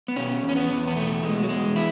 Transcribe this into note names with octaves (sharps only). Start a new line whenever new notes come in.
B3
B2 C#4
E2
C#4
B3
E2
B3
B2 A3
B2 G#3
F#3
E2 G#3
E3 E4